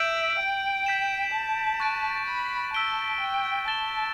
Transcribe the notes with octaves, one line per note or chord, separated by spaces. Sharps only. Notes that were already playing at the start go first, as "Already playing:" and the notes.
Already playing: E5 G6 D7 F#7
G5
G6 B6 E7
A5
C#6 F#6 A6 D7
B5
A5 E6 B6 D7 G7
G5
A5 A6 E7 G7